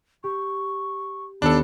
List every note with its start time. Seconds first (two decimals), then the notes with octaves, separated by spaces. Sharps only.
0.24 G4 C#6
1.42 D#2 B3 D4 A4 B5 F#6